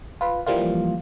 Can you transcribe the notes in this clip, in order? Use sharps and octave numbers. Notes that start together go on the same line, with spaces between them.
F4 B4
E3 F3 G3 A#3 F4